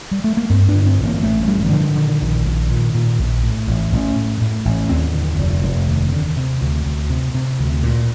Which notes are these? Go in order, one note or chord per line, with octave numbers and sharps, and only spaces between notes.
G3
A3
A#3
G2 C4
D4
D3
C4
A1
A#3
A1 A3
A3
G2 G3
D#3
D3 F3
A#2 D#3
A#1
A#1
A#2
A#2
A#1
A2
A1
A1
A2
A2
A1
D#2 C4
D3
F1
F1
D#2
D3
C3
D2
D2
C3
C3
D2
A#2